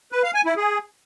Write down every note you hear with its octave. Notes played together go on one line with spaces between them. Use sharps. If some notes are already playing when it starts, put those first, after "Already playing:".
B4
F5
G#5
E4
G#4